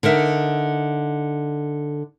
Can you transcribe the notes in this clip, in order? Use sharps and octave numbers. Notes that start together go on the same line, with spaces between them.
D3 D#4 A#4 E5